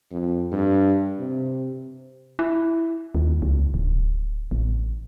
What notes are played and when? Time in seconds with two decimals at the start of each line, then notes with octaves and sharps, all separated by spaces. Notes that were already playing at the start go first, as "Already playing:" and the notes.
0.12 F2
0.52 G2
1.19 C3
2.39 E4
3.15 D#2
3.42 C#2
3.74 D1
4.51 A1